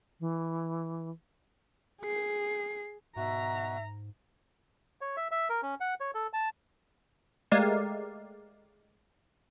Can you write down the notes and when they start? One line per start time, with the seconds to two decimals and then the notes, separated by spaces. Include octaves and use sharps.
0.20 E3
2.01 G#4 C7
3.16 G#2 B2 F#4 E5 A#5
5.01 C#5
5.17 E5
5.31 E5
5.49 A#4
5.63 C#4
5.80 F#5
6.00 C#5
6.15 A4
6.33 A5
7.52 G#3 A3 G4 A#4 D5 F5